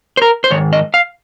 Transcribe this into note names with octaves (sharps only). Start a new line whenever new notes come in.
C5
A#4
C5
G#2 D#3 C#5
D#5
F5